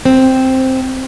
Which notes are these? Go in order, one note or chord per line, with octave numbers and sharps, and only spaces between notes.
C4